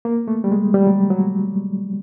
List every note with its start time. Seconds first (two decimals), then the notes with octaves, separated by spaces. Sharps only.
0.05 A#3
0.28 A3
0.44 G3
0.52 G#3
0.74 G3
0.87 F#3
1.10 F#3